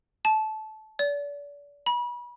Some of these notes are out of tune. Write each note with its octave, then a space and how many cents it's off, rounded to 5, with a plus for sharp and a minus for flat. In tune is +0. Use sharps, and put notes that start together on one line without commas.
A5 -20
D5 -35
B5 -35